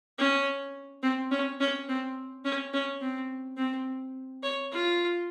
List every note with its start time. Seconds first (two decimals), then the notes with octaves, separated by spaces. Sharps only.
0.19 C#4
1.03 C4
1.31 C#4
1.60 C#4
1.88 C4
2.45 C#4
2.74 C#4
3.01 C4
3.57 C4
4.43 C#5
4.72 F4